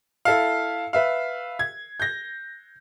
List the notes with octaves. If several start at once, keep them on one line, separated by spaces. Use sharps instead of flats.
E4 A4 E5 F5
B4 E5 F5
G#6
G6 A#6